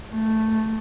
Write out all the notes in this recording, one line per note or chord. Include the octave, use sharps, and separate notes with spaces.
A3